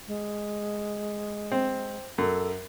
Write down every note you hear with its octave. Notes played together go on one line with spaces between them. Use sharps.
G#3
C4
F#2 A4